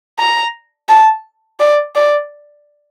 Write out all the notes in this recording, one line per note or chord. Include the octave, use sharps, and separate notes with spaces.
A#5
A5
D5
D5